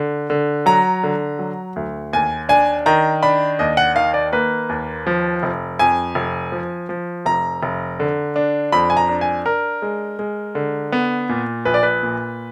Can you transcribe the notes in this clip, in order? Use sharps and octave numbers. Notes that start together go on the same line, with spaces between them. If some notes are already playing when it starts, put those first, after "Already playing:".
Already playing: D3
D3
F#3 A#5
D3
F#3
D2
D#2 G#5
D4 G#5
D#3 A#5
D4 B5
D#2 D#5
F#5
D#3 F5
D5
A#3 B4
D#2
F3
F1
F2 G#5
F1
F3
F3
F1 A#5
F1
D3
D4
F2 B5
G#5
A#5
D4
G#5
D4 A#4
G#3
G#3
D3
B3
A#2
A#1 B4
D5
B4
A#2